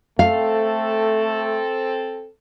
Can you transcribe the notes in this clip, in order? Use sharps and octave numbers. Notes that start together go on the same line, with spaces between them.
A3 C4 A4 F5